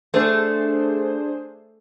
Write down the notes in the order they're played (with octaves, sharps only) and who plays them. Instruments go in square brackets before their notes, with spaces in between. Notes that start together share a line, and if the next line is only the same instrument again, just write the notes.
[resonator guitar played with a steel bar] A3 [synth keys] D4 G#4 C5